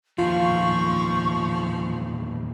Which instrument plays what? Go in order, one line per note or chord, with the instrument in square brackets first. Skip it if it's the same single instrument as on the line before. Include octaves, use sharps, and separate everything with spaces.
[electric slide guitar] E2 A#2 D#3 [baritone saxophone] F3 [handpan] F4 [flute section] C#6